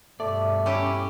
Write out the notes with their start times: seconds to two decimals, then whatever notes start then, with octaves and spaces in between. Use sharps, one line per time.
0.20 G2 B2 A3 D5
0.66 C#4 E4 G4